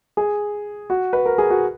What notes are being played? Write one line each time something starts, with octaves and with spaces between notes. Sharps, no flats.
G#4
F#4
B4
A#4
G#4
F#4